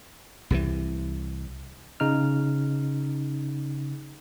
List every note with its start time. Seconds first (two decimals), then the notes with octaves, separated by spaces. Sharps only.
0.50 C2 C3 D#3 E3
2.00 C#3 D#4 F6